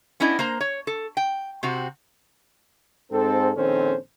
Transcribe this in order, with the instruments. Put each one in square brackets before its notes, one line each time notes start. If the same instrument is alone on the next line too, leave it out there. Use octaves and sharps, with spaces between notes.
[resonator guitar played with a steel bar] B3 C#4 D4 E4 D#5
A#3 C5 A#5
C#5
A4
G5
C3 C4 F#4
[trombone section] G#2 C4 A4
A#1 D#3 C4 C#4 A4 C5